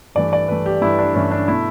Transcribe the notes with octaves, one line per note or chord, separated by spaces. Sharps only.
G2 E3 A3 D5
D5
G2 E3 A3 B4
G4
G2 E3 A3 E4
D4
G2 E3 A3 C#4
D4
B2 A3 E4